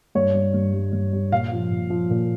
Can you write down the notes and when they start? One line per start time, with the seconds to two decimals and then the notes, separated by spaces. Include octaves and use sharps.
0.15 G2 C#5
0.34 G3
0.54 G2
0.73 G3
0.93 G2
1.13 G3
1.32 A#2 F5
1.52 F3
1.71 A#2
1.90 F3
2.10 A#2